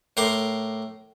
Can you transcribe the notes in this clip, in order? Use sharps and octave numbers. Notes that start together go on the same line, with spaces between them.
A2 A#4 C6 D6